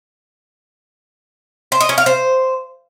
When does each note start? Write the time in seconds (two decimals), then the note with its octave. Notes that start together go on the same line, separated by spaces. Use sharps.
1.72 C5
1.81 D#5
1.89 C#4
1.98 F5
2.06 C5